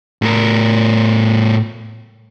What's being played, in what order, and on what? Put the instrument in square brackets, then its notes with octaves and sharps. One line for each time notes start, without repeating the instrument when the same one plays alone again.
[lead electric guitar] A2 A#4